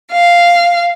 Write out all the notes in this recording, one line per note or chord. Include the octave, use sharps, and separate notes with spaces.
F5